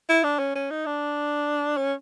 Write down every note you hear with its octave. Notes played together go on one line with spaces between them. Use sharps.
E4
D4
C#4
C#4
D#4
D4
C#4